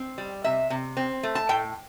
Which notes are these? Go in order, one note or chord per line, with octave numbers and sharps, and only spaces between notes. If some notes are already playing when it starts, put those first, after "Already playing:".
Already playing: C4
G3
C3 E5
C3
C4
A3
A5
A2 G5